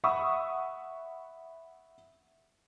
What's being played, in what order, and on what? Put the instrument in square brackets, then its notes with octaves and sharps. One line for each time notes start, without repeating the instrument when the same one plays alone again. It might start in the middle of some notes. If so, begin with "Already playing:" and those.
[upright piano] E5 F#5 B5 C#6 D#6 E6